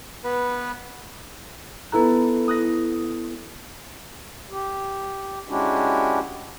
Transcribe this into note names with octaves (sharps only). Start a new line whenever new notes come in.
B3 B4
B3 E4 A4 B4 A#5 F#6
D#6 F#6 A#6
G4
G#3 C#4 D4 E4 F#4 G4